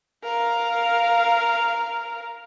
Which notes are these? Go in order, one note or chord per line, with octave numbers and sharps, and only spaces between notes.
A#4 F5